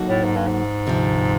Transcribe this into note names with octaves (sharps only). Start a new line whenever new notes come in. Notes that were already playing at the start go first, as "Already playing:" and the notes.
Already playing: F#3 A#3 D#4 F#4 A4
A2
G#2
G2
G#2
D2 C3 F3